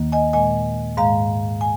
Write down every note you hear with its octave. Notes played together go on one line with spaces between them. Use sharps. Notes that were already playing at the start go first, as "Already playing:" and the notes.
Already playing: D#2 D#3 A#3
D#5 G#5
A#2 G#3 D#5 G#5
G#2 G#3 F5 A#5
G#5